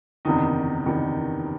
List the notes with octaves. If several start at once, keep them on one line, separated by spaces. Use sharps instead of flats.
F#1 E2 C3 D#3 D#4
F#1 E2 C3 D#3